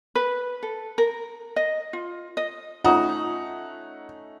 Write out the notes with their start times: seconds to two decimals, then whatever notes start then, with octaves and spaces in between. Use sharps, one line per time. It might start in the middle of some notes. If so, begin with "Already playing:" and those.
0.15 B4
0.63 A4
0.98 A#4
1.56 D#5
1.93 F4
2.37 D#5
2.84 A3 C#4 D#4 F4 F#5 A#5 D#6